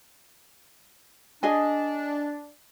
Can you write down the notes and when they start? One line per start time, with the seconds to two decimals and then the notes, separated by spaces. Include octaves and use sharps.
1.43 D4 G#4 D#5 G#5